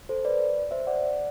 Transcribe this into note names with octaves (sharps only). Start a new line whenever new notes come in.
A4 C5
B4 D5
C5 E5
D5 F#5